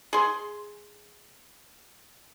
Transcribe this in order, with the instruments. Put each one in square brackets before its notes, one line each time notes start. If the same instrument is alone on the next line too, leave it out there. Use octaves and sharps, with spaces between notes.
[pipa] G#4 C6